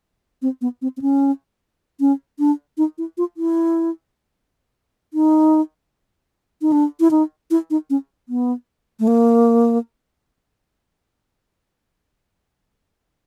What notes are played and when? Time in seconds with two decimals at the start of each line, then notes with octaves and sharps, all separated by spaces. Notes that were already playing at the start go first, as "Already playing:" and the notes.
0.42 C4
0.61 B3
0.82 C4
0.97 C4
1.01 C#4
2.00 C#4
2.39 D4
2.78 D#4
2.98 E4
3.18 F4
3.37 E4
5.14 D#4
6.62 D#4
6.72 D4
7.00 E4
7.11 D#4
7.51 E4
7.70 D#4
7.90 C#4
8.29 B3
9.00 A3
9.07 A#3